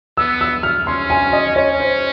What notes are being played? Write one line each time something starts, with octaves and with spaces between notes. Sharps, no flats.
B3 E6
E6
F6
C#4 C6
G#5
D#5
C#4 C#5
C5